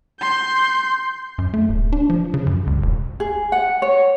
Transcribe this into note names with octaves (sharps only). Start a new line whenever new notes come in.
C6 G6
F#2
A3
D1
D4
F3
C#3
F#2
C#2
E1
G#4
F#5
C#5